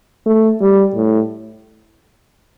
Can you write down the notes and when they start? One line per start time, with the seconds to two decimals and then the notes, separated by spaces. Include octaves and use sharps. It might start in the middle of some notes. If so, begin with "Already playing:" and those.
0.26 A3
0.61 G3
0.95 A2